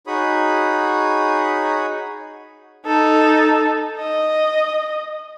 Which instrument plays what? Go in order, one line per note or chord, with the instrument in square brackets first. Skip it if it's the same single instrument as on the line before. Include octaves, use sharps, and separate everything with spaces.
[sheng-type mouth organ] D#4 F#4 G#4 C#5 B5 D#6
[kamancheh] D#4 A4
D#5